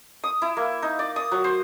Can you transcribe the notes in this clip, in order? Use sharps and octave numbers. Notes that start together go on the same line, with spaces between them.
D#6
E4
A#3
D#4
D5
D#6
F#3
C5